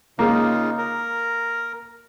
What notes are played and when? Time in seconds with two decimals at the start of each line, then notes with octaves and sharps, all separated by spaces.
0.19 C#3 G#3 A#3 D#4 F4
0.78 A#4